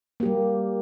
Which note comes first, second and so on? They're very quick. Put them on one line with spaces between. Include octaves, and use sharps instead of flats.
A#3 G4 G3